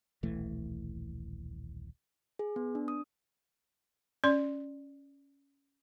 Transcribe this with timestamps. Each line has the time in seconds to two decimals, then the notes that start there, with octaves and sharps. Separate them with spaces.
0.23 D#1 B1 E3 A3
2.39 G#4
2.56 B3
2.75 D4
2.88 D#6
4.24 C#4 D5 C6